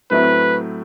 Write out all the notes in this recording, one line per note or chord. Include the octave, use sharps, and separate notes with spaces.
A2 F#3 A3 C4 E4 B4